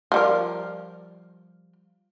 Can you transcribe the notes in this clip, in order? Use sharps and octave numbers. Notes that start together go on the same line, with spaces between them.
F3 G3 A#4